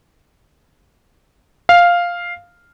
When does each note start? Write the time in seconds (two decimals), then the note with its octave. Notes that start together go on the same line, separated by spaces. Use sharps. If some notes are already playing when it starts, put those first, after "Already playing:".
1.69 F5